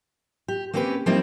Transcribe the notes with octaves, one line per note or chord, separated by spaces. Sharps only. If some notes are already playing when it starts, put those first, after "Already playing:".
G4
A#3 C4 C#4 G4 G#4 B4
F3 G3 A#3 C4 D#4 E4